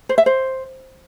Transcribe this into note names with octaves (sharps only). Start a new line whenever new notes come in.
C5
E5
C5